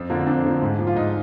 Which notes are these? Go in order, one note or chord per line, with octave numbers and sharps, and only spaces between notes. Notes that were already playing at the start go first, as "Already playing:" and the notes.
Already playing: F2 C4
D3 F3 A#3
C4
F2 D4
D3 F3 A#3
G#2
F3 A#3
F4
G#2 D#4